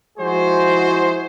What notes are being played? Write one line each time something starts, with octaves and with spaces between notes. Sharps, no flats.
F3 G#3 E4 F#4 G#4 C5